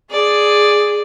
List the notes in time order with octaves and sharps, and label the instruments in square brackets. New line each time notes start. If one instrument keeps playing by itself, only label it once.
[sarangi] G#4 [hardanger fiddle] D5